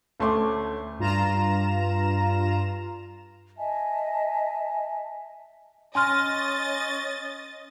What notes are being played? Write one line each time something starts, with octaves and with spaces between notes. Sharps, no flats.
D2 A3 C#4 C6 D6
G2 F4 A#5 E7
D#5 E5 G#5 A5
C#4 D#5 G#5 C6 F6 A6